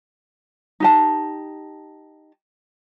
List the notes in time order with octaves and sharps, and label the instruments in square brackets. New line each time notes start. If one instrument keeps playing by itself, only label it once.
[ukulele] D#4 G4 A5